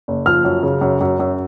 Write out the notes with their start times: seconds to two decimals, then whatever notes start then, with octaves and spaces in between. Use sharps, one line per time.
0.08 F#1
0.26 F3 F6
0.45 F#2
0.63 C#3
0.81 F#2
1.01 F#2
1.19 F#2